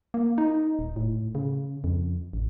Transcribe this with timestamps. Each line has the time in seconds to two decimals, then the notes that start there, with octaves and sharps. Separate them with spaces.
0.14 A#3
0.38 D#4
0.79 D#1
0.96 A2
1.35 C#3
1.84 F2
2.33 A1